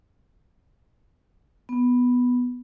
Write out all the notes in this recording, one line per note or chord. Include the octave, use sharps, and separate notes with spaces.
B3